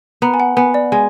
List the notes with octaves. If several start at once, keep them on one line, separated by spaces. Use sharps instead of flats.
B3 A#5
G#5
F#5
B3 G#5
D5
G#3 G#5